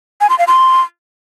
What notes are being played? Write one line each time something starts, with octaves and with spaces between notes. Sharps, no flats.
G#5
C6
F5
C6